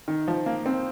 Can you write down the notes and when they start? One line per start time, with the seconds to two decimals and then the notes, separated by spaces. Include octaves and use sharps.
0.08 D#3
0.28 F3
0.46 A#3
0.66 C4